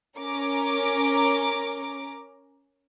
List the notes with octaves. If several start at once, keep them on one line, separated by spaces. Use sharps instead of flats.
C#4 A#4 A#5 D6